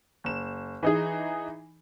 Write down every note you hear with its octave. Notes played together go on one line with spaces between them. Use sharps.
F#1 E7
E3 D#4 G#4